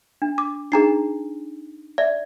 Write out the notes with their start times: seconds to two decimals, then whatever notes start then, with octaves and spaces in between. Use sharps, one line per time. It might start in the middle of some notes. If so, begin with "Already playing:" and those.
0.22 D4
0.38 D6
0.72 D4 D#4 G#4 A#5 C7
1.98 D5 E5